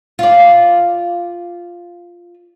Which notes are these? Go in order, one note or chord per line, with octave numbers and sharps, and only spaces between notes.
F4 D5